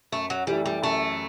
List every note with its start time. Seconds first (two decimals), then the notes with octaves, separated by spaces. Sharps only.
0.12 F#2 A3
0.30 F#3
0.47 E3 G3 A3 E4
0.66 G3
0.82 F#2 A3